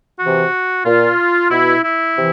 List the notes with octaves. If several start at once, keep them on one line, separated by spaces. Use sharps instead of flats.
C3 E3 F#4
A#2 F4
B2 E4
E4
C3 E3